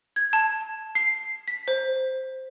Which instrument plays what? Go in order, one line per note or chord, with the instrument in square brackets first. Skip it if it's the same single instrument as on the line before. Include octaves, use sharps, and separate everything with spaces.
[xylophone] G#6
A5
C7
B6
C5